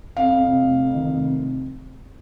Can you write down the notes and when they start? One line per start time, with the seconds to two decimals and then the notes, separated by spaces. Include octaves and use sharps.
0.17 F2 F5
0.32 F2
0.47 C3
0.62 F1
0.78 F2
0.93 D#3
1.08 F1
1.23 C3